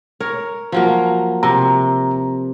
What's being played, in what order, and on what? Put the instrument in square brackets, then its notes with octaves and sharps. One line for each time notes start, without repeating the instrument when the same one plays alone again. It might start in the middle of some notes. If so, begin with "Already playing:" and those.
[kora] A#4 C#5
F3 F#3 A#3
[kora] C3 [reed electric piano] A#5